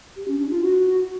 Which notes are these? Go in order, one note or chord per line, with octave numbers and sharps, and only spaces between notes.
G4
C#4
D4
F4
F#4